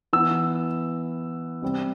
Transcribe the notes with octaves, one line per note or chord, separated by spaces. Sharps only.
E3 B3 E6
C3 G3 C4